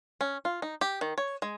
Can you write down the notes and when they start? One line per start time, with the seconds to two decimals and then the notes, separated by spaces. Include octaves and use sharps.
0.21 C#4
0.45 F4
0.62 D#4
0.81 G4
1.01 D#3
1.18 C#5
1.42 G#3